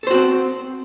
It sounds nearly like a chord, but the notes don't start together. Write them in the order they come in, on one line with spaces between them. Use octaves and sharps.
A4 C5 F#4 C4